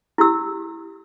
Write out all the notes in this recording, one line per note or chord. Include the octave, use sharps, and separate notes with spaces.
E4 G4 E6